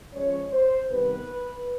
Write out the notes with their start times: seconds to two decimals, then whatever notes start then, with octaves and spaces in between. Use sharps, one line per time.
0.13 F3 G#3 C#4 C#5
0.51 C5
0.90 C3 D#3 G3 B3 B4